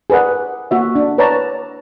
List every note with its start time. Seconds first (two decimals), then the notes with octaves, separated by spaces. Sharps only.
0.10 G#4 A#4 B4 D5 F#5
0.71 A#3 F#4 E5
0.95 D4
1.18 B4 C#5 D5 A5 A#5